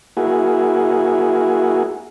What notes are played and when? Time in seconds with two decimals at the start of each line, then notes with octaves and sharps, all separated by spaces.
0.17 A#3 E4 F#4 G#4